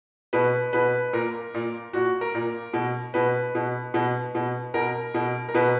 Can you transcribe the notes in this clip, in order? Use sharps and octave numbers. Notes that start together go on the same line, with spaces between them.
B2 B4
B2 B4
A#2 A#4
A#2
A#2 F#4
A#4
A#2
B2
B2 B4
B2
B2
B2
B2 A#4
B2
A#4
B2 B4